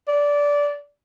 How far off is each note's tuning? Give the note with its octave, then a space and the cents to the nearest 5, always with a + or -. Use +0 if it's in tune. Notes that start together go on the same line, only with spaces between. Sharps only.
D5 -15